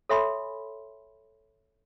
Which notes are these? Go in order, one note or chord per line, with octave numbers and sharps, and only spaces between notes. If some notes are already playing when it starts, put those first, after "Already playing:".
A4 C#5 E5 G#5 B5 C6